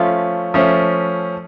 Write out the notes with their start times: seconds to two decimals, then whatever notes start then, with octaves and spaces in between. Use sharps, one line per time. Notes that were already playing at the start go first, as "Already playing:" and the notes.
Already playing: F3 A3 C#4 F4
0.54 F3 A3 C#4